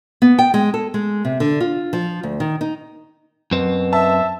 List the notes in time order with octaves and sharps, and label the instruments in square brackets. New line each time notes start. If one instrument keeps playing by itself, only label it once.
[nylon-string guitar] B3
G5
G#3
A4
G#3
C3
D3
F4
F3
D2
D#3
D#4
[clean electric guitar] F#2 C4 [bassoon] B2
[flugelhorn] E5 [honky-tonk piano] A5